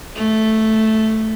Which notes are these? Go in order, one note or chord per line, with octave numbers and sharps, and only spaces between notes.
A3